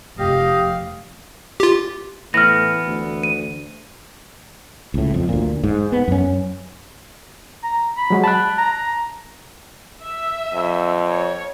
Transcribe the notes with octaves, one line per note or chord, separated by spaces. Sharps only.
F1 G4 D#5 F5
F4 G4
A2 E3 B3 F6 A#6
D2
D#7
C#2 A2
F2
D2 A#2
G#2
B3
F#2 C#4
A#5
B5
F#3 G#3 F#4
A5 B5 F#6
A#5
E5
F2
C#5